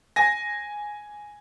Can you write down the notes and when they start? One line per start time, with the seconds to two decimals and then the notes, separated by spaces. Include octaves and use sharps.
0.16 G#5 A#6